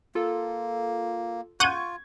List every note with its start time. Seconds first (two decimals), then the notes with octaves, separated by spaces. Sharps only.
0.15 A#3 F4 A4
1.60 F4 F#5 C#6 G6 G#6 D#7